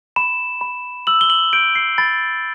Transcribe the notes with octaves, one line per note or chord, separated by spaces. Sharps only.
B5 E7
B5
E6 F#7
G7
F#7
G6 D7
C7
B5 A6